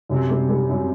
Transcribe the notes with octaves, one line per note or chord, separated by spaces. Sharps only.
F#2 C3
G3
G3
F#2